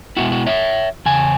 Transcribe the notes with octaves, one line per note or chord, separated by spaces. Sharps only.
B2 G#3 B3 E4 F#4
F#4
C#5 E5
E2 C#3 G#5